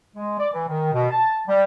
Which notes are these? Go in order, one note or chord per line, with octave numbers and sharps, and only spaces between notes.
G#3
D5
E3
D#3
B2
A5
G3